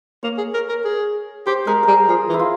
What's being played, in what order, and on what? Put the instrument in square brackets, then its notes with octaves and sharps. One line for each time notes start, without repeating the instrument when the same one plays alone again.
[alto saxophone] A#3 [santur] C#5
[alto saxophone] G#4
A#4
A#4
G#4
[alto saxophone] G4 [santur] C5
[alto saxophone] G#3 [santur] A#4
[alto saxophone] G3 [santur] G#4 A#4
[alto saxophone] F3 [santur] G#4
[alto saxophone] E3
[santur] E4
F4